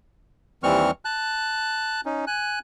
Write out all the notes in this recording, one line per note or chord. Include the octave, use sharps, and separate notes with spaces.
D#2 E3 G3 C4 C#6 F6
A5 F#6
C#4 D#4
G#5 F#6